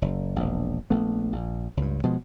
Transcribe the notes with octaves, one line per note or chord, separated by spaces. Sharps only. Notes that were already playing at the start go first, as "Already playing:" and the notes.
F#1
E1 A#1
A#1 A3 B3
A#1
C#2 G2
B2 F3 G#3